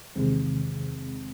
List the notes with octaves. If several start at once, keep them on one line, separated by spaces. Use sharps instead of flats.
E2 C3 D#3 G#3 C4